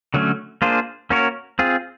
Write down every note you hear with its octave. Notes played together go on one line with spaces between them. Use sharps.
D3 F#3 A3 C#4
A#3 D4 F4 G#4 C5
A#3 C#4 F#4 A#4 C#5
C4 F4 G#4